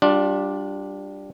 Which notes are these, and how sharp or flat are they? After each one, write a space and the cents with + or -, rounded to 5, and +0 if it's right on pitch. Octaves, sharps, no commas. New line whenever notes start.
G3 +0 D4 +0 F4 +30